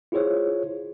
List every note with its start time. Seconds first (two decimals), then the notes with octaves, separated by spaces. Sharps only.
0.12 E4 F4 G#4 C5 C#5